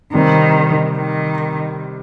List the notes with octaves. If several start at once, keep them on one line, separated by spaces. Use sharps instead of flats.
C3 D#3 G3 C4
D#3